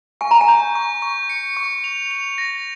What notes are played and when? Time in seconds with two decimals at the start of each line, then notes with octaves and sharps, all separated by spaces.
0.21 G#5 C#6
0.31 A#5
0.41 G#5
0.48 G6
0.75 C#6
1.02 C#6
1.29 C#7
1.57 C#6
1.84 F7
2.11 F7
2.38 A#6